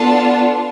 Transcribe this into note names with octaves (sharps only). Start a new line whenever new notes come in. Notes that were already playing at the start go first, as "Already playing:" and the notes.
Already playing: B3 D4 F4 A4 A5